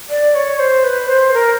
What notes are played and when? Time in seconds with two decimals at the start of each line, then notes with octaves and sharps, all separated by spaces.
0.10 D5
0.35 C#5
0.59 C5
0.84 B4
1.09 C5
1.34 A#4